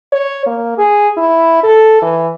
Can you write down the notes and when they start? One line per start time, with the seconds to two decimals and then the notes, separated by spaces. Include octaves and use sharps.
0.12 C#5
0.46 A#3
0.78 G#4
1.17 E4
1.63 A4
2.02 E3